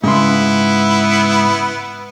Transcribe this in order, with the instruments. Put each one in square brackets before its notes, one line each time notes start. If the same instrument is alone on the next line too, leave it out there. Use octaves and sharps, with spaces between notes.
[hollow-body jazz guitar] G#2 C#3 C6 [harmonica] B3 E4